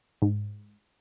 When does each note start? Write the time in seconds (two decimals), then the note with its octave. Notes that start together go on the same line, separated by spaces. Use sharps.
0.22 G#2